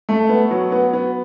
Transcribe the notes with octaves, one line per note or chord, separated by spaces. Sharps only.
A3
B3
F#3
B3
B3